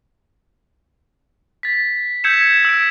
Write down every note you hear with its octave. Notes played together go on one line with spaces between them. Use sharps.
A6 B6
E6 G6 G#6 B6 C#7 E7
E6 B6 D7